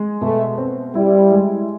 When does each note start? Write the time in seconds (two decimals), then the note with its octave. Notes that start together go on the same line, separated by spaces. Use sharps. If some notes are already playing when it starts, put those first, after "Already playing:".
Already playing: G#3
0.21 B2 A3
0.58 C4
0.95 G3 E4
1.32 G#3